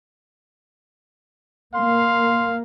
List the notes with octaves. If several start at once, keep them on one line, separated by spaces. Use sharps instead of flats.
A#3 F5 C6